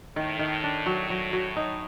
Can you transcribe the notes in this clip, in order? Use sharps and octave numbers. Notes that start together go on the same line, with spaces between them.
A2 D#3
D#3
D4
F#3
F#3
F#3
D#4